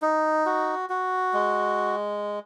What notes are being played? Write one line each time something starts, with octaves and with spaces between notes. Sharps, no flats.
D#4
F#4
F#4
G#3